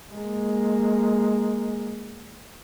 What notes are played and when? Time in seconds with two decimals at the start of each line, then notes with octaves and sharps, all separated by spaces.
0.11 G#3 A#3